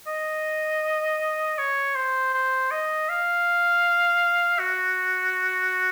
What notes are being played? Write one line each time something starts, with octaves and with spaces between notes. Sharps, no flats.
D#5
C#5
C5
C5
D#5
F5
F#4